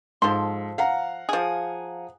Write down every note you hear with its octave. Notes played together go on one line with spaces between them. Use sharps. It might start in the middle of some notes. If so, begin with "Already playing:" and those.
G#2 F3 A4 C6
F5 F#5 A#5
F3 G#4